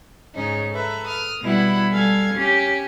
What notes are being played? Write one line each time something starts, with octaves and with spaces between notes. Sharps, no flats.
G#2 C#3 C#4 D#4
A4 B4 E5 A#5
D#6 F6
B2 G3 E4 F#5 B5
G3 A4 F5 G#5 G#6
C#4 G4